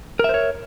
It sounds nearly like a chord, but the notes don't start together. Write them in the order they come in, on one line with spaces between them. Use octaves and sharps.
A#4 E5 C5 C#5